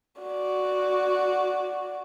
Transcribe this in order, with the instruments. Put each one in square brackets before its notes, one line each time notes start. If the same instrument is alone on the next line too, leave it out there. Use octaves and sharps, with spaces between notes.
[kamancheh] F#4 D5